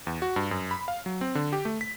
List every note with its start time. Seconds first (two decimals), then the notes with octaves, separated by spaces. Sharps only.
0.07 E2
0.22 F#4
0.36 G2
0.51 F#2
0.71 B5
0.88 F5
1.06 F#3
1.21 C4
1.35 D3
1.53 G4
1.65 A3
1.81 B6